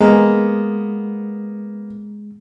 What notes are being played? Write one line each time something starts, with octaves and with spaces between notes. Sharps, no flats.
G#3 A#3 B3